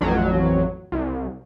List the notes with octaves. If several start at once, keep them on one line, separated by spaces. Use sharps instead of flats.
A1 F2 F#3
C2